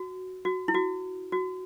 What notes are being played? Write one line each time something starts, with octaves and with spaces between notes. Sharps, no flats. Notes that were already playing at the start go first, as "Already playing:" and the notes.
Already playing: F#4
F#4
E4
F#4
F#4